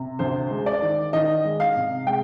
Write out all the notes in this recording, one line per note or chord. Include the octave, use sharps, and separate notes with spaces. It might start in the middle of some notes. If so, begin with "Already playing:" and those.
Already playing: C3
D2 C5
G#3
D5
D#3
D#3 D#5
G#3
F5
C3
G#3 G5